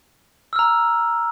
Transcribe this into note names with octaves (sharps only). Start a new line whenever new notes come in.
A#5 E6 F6